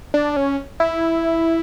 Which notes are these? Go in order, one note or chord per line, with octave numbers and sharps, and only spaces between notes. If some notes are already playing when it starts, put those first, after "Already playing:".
D4
C#4
E4